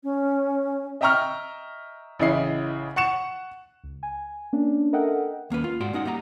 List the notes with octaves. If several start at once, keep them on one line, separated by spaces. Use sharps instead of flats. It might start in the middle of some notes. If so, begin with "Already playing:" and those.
C#4
D#5 E5 G5 A#5 C#6 F6
A1 C#3 E4 D#5 C7
F#5 C#6 C#7 E7
C#2
G#5
A#3 C#4 D4
A4 A#4 D#5 E5 F#5 G5
D#2 A#3 C#4 B4
F4
G#2 F#4 D5 C6
C#4 D#4 D#5 F#5
G3 A#3 D#5 A#5